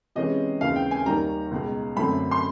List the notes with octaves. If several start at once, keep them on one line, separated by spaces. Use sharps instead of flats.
C3 E3 G#3 C#4 D#5
D#2 C#3 E3 G#3 C4 F5
G5
G#5
D#2 D#3 G3 A#5
C#2 B2 G#3
F#2 D3 F#3 A3 C4 B5
C6